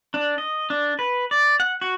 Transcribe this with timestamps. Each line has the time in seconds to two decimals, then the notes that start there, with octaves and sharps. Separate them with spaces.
0.14 D4
0.38 D#5
0.70 D4
0.99 B4
1.31 D5
1.60 F#5
1.81 F#4